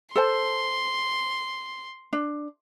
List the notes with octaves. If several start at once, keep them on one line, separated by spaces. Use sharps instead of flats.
A4 C5 A5 C6
D4